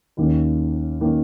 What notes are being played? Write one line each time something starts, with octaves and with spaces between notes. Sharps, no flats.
D#2 D#3 A#3 C#4
D#3 A#3 C#4